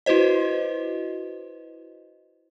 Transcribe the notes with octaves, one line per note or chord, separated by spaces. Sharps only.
E4 F#4 B4 C5 D#5